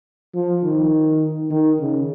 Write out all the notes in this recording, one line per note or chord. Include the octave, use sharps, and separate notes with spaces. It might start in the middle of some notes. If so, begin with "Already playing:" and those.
F3
D#3
D#3
C#3